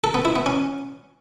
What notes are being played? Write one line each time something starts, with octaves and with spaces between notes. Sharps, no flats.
A4
B3
E4
B3
C#4